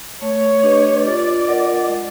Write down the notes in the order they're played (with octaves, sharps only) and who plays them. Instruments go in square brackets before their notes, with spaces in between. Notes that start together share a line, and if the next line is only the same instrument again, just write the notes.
[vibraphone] A3 [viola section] C#5
[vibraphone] D4 G4 B4 D#5
[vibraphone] F4 [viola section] D5
[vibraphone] A#4 D#5 F#5
G#3